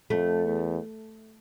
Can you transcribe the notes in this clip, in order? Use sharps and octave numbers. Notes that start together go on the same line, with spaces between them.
F2 A3
E2